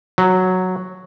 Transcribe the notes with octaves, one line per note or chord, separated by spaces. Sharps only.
F#3